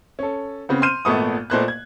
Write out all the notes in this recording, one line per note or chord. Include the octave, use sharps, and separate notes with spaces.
C#4 A4
C#3 B3 C4
C6 F6 G6 D#7 E7
G#1 A#2 A3 B3 C#6 D#6
A#2 A3 B3 C5 D#5 F#6
G#6